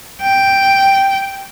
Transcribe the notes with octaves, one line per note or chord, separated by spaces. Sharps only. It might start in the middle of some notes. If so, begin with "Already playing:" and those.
G5